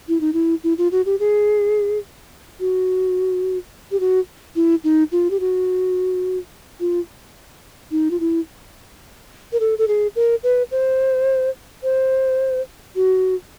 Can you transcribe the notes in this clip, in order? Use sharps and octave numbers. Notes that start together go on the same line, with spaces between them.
E4
D#4
E4
E4
F4
F#4
G4
G#4
F#4
G4
F#4
E4
D#4
F4
G4
F#4
F4
D#4
F4
E4
A#4
A4
A4
G#4
A#4
B4
C5
C5
F#4